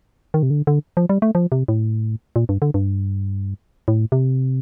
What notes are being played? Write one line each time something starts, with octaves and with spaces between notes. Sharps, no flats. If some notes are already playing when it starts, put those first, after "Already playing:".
D#3
C3
D3
D3
F3
G3
A3
F3
C3
A2
A#2
G2
D3
G2
A2
C3